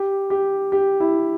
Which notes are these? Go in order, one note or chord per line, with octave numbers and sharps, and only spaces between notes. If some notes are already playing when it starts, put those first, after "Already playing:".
Already playing: G4
G4
G4
E4